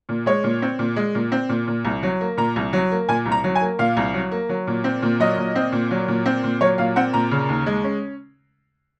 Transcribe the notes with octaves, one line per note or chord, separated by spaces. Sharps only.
A#2
G#3 C#5
A#2
C4
A#2
G#3
A#2
C4
A#2
A#2
C2
F#3
A#3
A#2 A#5
C2
F#3
A#3
A#2 G#5
C2
A#5
F#3
G#5
A#3
A#2 F5
C2
F#3
A#3
F#3
A#2
C4
A#2
F#3 D#5
A#2
C4
A#2
F#3
A#2
C4
A#2
F#3 C#5
A#2 F5
C4 F#5
A#2 A#5
C#3
D#2
G#3
C#4